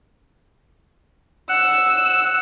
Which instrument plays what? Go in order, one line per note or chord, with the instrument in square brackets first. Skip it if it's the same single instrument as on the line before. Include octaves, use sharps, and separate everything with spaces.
[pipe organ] F#5 [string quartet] E6